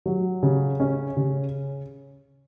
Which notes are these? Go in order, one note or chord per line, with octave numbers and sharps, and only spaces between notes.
F#3
C#3
C#4
C#3